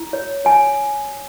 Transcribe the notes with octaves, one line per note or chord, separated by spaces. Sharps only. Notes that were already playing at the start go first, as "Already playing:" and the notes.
Already playing: E4
C#5
C#5 G#5